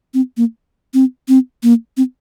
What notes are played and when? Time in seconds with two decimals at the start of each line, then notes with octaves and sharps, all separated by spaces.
0.14 C4
0.37 A#3
0.94 C4
1.28 C4
1.63 A#3
1.97 C4